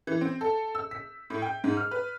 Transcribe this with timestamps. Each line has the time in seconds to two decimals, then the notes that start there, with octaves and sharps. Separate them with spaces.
0.07 E3
0.21 C4
0.41 A4
0.75 E6
0.91 B6
1.30 A2
1.42 G5
1.64 G#2
1.77 F6
1.91 B4